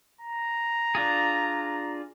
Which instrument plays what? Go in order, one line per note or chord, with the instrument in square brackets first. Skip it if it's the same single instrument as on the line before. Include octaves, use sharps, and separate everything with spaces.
[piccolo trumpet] A#5
[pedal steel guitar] D4 F4 G#4